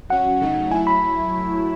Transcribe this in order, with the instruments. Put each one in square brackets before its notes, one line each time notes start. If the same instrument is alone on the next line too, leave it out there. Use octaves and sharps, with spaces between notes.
[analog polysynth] F#3 C#4 F#4 [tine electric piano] F#5
[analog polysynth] C#3 F#3 A3 D#4
[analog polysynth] F#3 A3 E4 [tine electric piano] G#5
[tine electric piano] B5